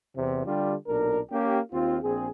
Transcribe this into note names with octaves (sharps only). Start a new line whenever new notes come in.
E2 C3
D3 G3 D4 F4 G4
B1 A#2 D4 A#4
A#3 C#4 G4
D#2 C4 F4
A#1 C4 G#4